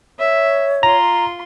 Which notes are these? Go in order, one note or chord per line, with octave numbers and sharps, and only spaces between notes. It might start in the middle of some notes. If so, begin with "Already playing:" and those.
C#5 E5
F4 A#5 C6